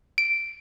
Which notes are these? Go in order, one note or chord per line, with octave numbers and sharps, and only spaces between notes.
D7